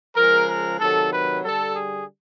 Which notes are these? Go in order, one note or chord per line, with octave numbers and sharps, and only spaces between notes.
C#3 F3 G#3 A#4
A#4
C3 D#3 F#3 A4
B4
D3 G3 A4
G#4